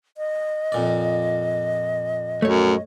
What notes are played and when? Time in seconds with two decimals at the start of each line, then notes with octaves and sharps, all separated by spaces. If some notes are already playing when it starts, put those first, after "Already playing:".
0.17 D#5
0.72 F2 A#2 D5
2.42 F#2 A3 C#5